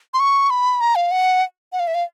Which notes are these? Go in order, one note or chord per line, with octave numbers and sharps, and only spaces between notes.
C6
C#6
B5
A#5
F5
F#5
F#5
F5
E5
F5